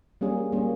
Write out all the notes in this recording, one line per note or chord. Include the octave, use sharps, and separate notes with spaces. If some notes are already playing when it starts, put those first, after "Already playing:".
G3 A#3 C#4 G#4
G3 A#3 C#4 G#4